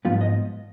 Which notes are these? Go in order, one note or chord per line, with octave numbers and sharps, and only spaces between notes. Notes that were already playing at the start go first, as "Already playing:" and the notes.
G#2 F3 B3 F4
D#5